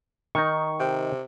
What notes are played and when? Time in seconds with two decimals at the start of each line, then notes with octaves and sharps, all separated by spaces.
0.35 D#3 D#4 C#6
0.80 C3 G5